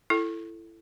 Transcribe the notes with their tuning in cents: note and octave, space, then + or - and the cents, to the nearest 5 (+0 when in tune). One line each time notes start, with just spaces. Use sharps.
E4 +25 A4 +0